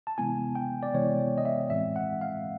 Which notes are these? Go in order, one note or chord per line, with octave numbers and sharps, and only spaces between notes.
A5
C3 E3 G#3 B3 E4 G#5
G5
D5
C3 E3 G#3 B3 E4 C#5
D#5
E5
A2 E3 G#3 C4 E5
F#5
F5